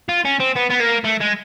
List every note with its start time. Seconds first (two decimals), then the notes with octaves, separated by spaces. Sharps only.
0.09 F4
0.25 C#4
0.40 C4
0.56 B3
0.70 B3
0.81 A#3
1.05 A3
1.21 G#3